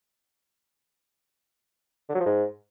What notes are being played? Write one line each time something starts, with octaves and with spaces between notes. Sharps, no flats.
D3
F#3
F3
G#2